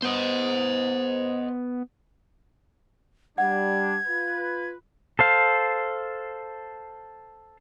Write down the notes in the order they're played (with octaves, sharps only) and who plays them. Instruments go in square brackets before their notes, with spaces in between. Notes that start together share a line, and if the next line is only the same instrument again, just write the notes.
[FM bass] B3 [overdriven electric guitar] C5 D#5
[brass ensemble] G3 D4 [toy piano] F#5 [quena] G#6
[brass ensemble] F4 B4
[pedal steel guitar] A4 C5 F5